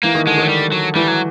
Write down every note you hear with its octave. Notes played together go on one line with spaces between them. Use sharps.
E3 A#3
D#3
D3 G#3
D#3 F#3
G3
F#3
E3 G3
F#3